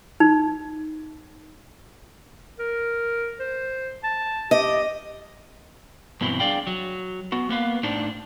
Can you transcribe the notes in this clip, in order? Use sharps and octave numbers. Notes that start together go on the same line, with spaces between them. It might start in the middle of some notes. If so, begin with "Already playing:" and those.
D#4
A#4
C5
A5
G4 D#5
G2 B2 E3 F#3 C4 E4
D4 G#4 D5 F5 G5
F#3
B3 F#4
A#3 B3 B4 F5
A2 D4 D#4 C5